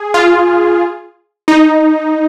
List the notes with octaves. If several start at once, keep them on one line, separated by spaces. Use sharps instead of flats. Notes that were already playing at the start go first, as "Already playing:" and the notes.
Already playing: G#4
F4
D#4